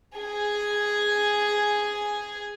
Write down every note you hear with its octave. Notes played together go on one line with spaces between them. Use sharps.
G#4 G#5